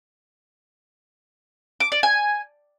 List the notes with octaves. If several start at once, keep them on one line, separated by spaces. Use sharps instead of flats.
D6
D5
G#5